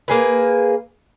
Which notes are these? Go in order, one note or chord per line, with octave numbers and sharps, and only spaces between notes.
A#3 G#4 B4